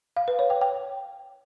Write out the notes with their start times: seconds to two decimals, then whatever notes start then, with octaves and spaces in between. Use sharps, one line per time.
0.17 F5
0.28 B4
0.39 C#5
0.50 G5
0.61 G5